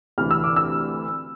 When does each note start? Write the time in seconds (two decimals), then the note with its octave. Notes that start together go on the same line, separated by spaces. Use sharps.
0.18 D2 C3 E3 F6
0.31 E6
0.44 D6
0.56 E6